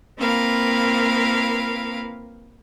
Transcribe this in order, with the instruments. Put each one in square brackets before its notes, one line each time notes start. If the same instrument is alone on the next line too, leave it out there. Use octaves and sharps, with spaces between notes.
[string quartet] A#3 C4 E4 A#4 B4 F5